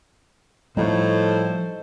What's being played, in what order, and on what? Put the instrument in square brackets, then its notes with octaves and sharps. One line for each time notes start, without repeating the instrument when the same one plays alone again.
[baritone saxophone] A2 [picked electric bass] F3 G3 [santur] D#4 E5 C#6 [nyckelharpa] A4 C5